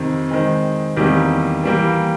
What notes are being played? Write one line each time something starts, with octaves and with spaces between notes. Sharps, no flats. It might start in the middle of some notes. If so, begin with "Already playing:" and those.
Already playing: F2 C3 D#3
D#3 G#3 C4
E2 C3 D#3 G3 A#3
E3 G3 A#3